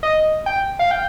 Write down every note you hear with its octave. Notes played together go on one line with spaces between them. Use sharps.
D#5
G5
F5
G5